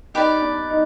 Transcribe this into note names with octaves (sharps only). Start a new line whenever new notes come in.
D#4 G4 B4 D5
D4
D#4